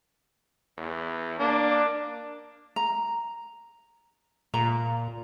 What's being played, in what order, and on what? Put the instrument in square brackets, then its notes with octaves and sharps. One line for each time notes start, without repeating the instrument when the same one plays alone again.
[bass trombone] E2
[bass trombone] A#3 [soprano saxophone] D4
[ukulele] A#5
[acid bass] A#2 [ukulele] A#5